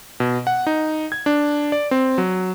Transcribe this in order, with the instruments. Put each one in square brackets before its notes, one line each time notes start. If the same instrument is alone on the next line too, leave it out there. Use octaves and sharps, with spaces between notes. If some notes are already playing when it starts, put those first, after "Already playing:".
[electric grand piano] B2
F#5
D#4
G#6
D4
D5
C4
F#3